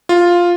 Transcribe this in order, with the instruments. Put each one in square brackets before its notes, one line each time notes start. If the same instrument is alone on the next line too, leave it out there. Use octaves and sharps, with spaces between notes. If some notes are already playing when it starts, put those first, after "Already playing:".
[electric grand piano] F4